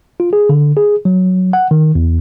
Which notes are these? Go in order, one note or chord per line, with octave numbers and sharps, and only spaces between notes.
F4
G#4
D3
G#4
F#3
F#5
D#3
E2